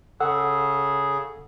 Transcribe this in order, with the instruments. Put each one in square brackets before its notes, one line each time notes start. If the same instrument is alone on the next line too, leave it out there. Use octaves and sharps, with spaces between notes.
[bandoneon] C#3 G#4 [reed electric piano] A4 F#5 E6